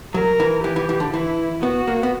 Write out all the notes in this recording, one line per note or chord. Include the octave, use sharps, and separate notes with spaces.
F#3 A#4
E3
E3 G4
E3
E3
D3
E3 E4
B3 F#4
A#3
B3